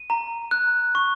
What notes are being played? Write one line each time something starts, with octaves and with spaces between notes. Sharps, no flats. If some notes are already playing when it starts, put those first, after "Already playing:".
Already playing: D#7
A#5
F#6
C#6